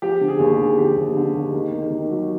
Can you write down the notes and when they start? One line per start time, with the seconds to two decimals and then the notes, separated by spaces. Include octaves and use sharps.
0.02 F3 G4
0.21 D3
0.28 G#4
0.39 D#2
0.53 G#4
0.59 D3
0.78 F3 G4
0.97 D#2
1.16 D3
1.34 D#2
1.54 D#3
1.72 D#3
1.90 D#3
2.10 F#3